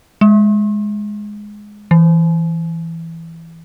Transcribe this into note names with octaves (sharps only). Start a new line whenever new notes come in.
G#3
E3